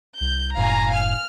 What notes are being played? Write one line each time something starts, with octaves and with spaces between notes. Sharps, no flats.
C2 G6
F#1 A2 F5 G#5 A#5
F6